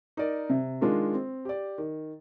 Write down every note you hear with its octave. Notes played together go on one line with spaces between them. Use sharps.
D#4 A#4 D5
C3
D#3 G#3 D4 F4
C4
G4 D5
D#3